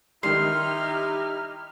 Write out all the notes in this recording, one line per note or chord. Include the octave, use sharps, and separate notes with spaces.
D#3 G3 D#4 E4 G4 C6 F6